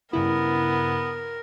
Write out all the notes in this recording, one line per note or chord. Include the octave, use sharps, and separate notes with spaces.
G2 C#3 B3 E4 A#4